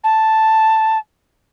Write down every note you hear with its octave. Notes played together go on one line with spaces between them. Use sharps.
A5